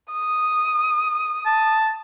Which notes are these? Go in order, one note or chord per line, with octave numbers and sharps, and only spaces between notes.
D#6
A5